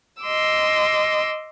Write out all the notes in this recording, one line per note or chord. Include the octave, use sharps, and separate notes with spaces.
D#5 C6 D6 E6